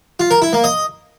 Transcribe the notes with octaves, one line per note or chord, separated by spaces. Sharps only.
F4
A#4
E4
A#3
D#5